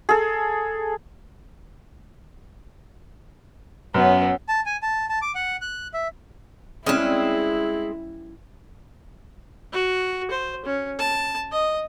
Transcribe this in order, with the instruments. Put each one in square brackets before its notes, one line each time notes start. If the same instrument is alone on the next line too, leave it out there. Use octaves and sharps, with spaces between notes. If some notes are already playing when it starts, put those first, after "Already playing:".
[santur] G#4 A4
[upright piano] F#2 [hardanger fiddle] B3 C#4
[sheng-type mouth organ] A5
G#5
A5
A5
D6
F#5
F#6
E5
[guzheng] G3 C#4 [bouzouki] G#3 C4 [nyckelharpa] E4
[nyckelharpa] F#4
C5
C#4
A5
D#5